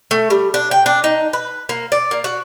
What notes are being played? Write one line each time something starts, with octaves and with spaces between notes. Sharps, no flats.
A3
G3
D4
G5
D4
D#4
B4
A#3
D5
A#3
F#4